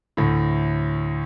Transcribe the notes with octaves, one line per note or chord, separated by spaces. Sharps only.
D2 A2